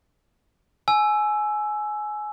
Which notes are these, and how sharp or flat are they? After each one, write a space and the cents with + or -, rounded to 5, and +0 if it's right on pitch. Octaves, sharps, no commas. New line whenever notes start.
G#5 +20 E6 +5